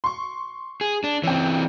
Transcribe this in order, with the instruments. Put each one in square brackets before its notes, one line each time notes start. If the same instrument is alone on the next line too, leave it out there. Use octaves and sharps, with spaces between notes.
[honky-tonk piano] C6 C#6
[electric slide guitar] G#4
D4
[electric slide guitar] E3 C4 [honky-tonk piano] C#4 G5